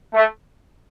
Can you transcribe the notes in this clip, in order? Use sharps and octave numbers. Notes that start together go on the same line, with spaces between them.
A3